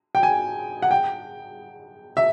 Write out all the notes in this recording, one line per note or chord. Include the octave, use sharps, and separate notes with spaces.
G5
G#5
F#5
G5
E5